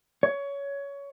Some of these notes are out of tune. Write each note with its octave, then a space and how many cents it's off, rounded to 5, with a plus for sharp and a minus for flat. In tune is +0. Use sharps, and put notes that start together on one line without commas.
C#5 +20